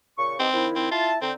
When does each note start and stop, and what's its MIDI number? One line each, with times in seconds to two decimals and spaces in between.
0.18 0.36 46
0.18 0.36 49
0.18 0.36 85
0.39 0.48 59
0.39 0.66 60
0.39 0.48 63
0.39 0.48 67
0.53 0.87 51
0.53 0.87 53
0.53 0.87 64
0.75 0.91 60
0.91 1.17 64
0.91 1.10 65
0.91 1.17 81
1.22 1.33 50
1.22 1.32 60
1.22 1.33 63